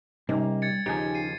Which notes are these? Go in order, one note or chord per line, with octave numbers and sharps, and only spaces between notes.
C3 G3 A#3 C#4 D#4
G#6 A6 C#7
D#2 C#3 F3 D#4 G4 G#5
C7 D#7